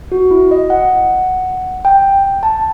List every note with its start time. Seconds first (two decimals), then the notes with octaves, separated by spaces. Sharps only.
0.12 F#4
0.31 E4
0.51 D#5
0.70 F#5
1.85 G5
2.43 A5